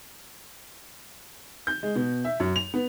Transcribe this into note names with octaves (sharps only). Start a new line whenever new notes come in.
G6
G#3
B2
E5
F#2
F7
B3